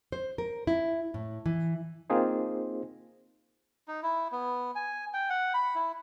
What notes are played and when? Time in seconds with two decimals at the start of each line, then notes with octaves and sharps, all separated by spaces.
0.12 C5
0.38 A#4
0.67 E4
1.14 A2
1.46 E3
2.10 A#3 C4 D#4 F4 G#4 C5
3.88 D#4
4.03 E4
4.32 B3
4.75 G#5
5.14 G5
5.30 F#5
5.54 B5
5.75 E4